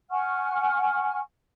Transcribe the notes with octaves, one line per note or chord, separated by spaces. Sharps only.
F#5 G#5 C#6 F6